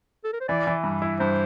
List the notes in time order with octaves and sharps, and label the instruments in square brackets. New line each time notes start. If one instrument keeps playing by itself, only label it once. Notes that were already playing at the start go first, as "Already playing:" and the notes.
[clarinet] A4
A#4
C5
[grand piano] E3 [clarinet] D5
[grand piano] E3
G2
E4
[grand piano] G2 [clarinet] C5